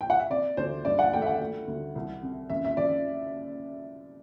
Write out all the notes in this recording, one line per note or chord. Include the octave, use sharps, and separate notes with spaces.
G5
F#5
E5
C3 D5
D2 C5
G2 D5
F#5
A3 G5
E5
F#5
A3
D2
C2
C3
F#2 E5
E5
F#2 D5